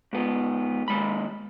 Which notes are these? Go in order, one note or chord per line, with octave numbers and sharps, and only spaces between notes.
G#2 B3
D#2 G#3 B5